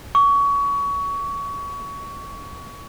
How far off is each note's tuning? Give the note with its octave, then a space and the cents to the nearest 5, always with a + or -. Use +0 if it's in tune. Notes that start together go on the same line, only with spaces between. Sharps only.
C#6 +25